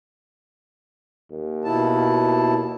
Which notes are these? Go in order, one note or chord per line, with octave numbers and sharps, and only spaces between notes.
D#2
B2 E4 A5